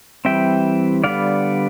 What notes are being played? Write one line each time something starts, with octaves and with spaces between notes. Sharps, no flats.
E3 G3 C4 E5 G5
D3 G3 B3 D5 F5